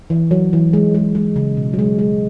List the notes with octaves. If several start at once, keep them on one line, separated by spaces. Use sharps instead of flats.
E3
F#3
E3
G#3
G#3
G#3
C#3
B2
F#3
G#3
G#3